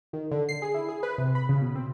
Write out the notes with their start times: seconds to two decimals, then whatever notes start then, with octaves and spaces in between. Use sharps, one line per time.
0.13 D#3
0.31 D3
0.49 C7
0.62 G#4
0.74 E4
0.89 G#4
1.03 B4
1.18 C3
1.35 B5
1.49 C#3
1.61 B2
1.75 C4